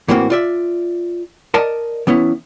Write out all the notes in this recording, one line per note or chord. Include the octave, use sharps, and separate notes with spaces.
A2 E3 A#3 C4 F#4
F4 D5 E5
A#4 D5 D#5 A5
E3 B3 C#4 E4